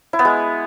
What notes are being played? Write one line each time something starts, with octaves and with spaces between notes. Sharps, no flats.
E4
B3
G#3